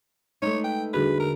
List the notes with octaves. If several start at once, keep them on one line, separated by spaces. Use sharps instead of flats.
G#3 A3 D#4 C#5
B4 G5
E2 D3 G3 D4 F#4 G#4 B4
A#4